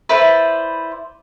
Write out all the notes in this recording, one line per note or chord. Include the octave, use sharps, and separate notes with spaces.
E4 B4 C5 D5